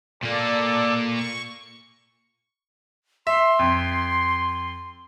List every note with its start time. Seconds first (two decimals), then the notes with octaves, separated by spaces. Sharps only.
0.23 A#2 A#3 A4 D5
1.12 C#6
3.27 E5 C6
3.59 F2